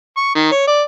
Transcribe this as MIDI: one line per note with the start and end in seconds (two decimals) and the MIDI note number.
0.17 0.33 85
0.35 0.50 51
0.51 0.64 73
0.67 0.82 74